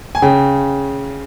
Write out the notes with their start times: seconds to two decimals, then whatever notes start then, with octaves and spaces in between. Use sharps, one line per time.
0.15 G#5
0.22 C#3 G5